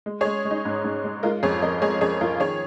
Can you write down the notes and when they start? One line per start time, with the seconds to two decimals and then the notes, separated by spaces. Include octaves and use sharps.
0.06 G#3
0.21 G#4 C#5
0.25 G#3
0.45 G#3
0.51 D#4
0.65 G#2
0.84 G#2
1.04 G#3
1.23 G#3 F4 A#4
1.43 F2 G#4 C#5
1.62 F2 A#4 D#5
1.82 G#3 G#4 C#5
2.01 F2 G#4 C#5
2.21 F2 F4 A#4
2.40 D#3 G#4 C#5